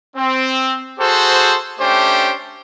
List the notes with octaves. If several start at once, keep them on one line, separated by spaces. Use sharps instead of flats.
C4
F#4 G#4 A4 C5
A3 C#4 D4 G4 C5 G5